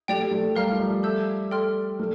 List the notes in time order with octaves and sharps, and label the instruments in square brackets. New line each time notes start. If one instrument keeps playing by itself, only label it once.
[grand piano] A3 [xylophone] G4 D5 G5
[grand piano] A3
[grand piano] G3 [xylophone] A#4 F5 A#5 F6
[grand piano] F3
G3
[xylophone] A4 E5 A5 E6 G6
A4 D5 G5 C6 F6
[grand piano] A3 [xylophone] A#4